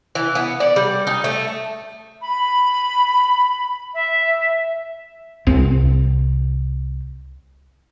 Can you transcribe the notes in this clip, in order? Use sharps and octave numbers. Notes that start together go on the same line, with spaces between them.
E3
B3
D5
G3
D#4
A3
B5
E5
C2 C4